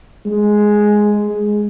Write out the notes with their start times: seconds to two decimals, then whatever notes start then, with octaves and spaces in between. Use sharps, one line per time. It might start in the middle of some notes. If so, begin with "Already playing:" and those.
0.26 G#3
1.29 G#3